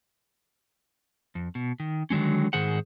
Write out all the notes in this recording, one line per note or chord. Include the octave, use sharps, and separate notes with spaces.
F2
B2
D#3
D3 D#3 F#3 G#3 C#4
G#2 D#3 G#4 C5 F#5